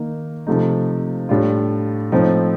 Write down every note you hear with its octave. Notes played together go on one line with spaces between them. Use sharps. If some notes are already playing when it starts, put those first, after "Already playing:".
Already playing: D#3 A#3 D#4
C3 F3 A3 D#4
A2 G3 D4 F4
A2 F3 C4 D#4